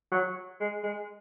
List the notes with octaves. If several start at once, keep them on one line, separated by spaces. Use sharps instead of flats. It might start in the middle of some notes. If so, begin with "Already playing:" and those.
F#3
G#3
G#3